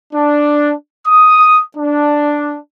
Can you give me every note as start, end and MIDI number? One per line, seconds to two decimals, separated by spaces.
0.13 0.73 62
1.07 1.60 87
1.76 2.56 62